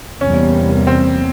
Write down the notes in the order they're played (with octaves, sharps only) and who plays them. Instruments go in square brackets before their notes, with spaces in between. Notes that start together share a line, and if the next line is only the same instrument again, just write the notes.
[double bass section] E2 C3 G3 A#3 [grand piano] C#4
[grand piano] C4